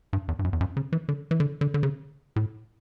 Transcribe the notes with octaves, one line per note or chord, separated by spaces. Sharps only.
G2
E2
G2
F#2
E2
F#2
C#3
E3
D3
E3
D3
D3
D3
C#3
A2